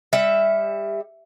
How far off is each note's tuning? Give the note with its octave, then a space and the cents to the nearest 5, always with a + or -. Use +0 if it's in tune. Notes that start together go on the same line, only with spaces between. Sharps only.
G3 +30 E5 +0